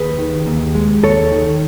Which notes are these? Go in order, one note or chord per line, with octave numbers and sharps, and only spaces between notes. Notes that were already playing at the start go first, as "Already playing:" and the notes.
Already playing: D#2 G#4 B4
D#3
D#2
G#3
D#2 A4 C#5
D#3